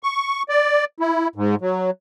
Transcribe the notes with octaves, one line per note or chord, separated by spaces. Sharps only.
C#6
D5
E4
G#2
F#3